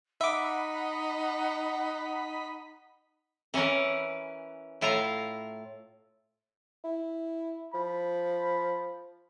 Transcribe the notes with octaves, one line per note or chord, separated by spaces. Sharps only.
D#4 E5 F#5 B5 D6
E3 C#4 E4 A#4 B4
A2 E4 F4 F5 A#5
E4
F3 B5